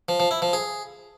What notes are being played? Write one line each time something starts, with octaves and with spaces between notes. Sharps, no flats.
F3
F3
E4
F3
G#4